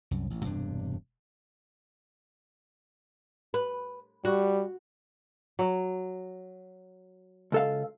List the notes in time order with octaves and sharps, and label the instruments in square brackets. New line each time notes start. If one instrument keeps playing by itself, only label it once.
[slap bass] C2 F#2
A1
E1 G2 C3 D4
[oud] B4
[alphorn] G3 [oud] F#4
[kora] F#3
[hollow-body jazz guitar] C#2 A4 F5